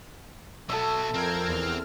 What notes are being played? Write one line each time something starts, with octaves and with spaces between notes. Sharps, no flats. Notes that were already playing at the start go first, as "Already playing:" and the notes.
B2 F#3 A4 E5
F2 C4 A#4 G#6
E2 F6